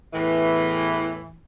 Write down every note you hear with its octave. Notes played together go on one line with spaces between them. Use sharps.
E2 A2 E3